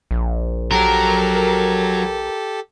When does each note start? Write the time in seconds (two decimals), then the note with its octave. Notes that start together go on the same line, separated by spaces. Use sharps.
0.11 A#1
0.72 F#3 G4 A4 A#4